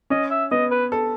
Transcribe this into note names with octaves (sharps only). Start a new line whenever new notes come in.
C#4 D#5
E5
B3 D#5
B4
A4